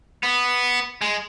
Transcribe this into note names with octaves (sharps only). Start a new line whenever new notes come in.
B3
G#3